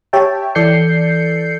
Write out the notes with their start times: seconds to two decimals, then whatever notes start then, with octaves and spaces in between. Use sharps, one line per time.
0.13 G4 C#5 E5 G5 A5
0.55 E3 A4 D5 G6 C7 C#7